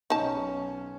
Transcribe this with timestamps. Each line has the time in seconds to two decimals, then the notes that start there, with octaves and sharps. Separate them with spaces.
0.10 B1 C#4 D#4 A5